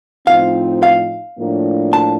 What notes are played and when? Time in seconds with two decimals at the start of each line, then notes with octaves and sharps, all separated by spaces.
0.27 A2 F3 C4 D#4 F5
0.83 F5
1.38 A2 F3 A#3 D4
1.93 A5